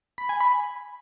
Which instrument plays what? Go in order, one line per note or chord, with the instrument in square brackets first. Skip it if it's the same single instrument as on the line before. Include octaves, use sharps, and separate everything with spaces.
[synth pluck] B5
G#5
B5